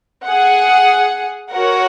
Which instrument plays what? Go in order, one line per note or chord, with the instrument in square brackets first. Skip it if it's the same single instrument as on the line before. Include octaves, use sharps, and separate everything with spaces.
[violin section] G#4 F#5
F#4 A#4 C#5 F#5